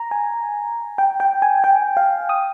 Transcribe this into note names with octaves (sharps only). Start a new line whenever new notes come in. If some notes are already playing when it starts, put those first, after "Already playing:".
Already playing: A#5
G#5
G5
G5
G#5
G5
F5
D#6